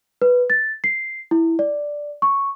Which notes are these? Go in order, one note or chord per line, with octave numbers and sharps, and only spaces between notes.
B4
A6
C7
E4
D5
C#6